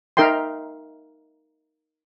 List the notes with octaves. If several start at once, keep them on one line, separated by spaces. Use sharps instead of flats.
D#4 A#4 E5 G5 C6